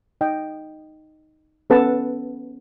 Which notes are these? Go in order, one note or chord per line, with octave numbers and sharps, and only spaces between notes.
D#4 D#5 G5
B3 C#4 A4 B4 F#5 A5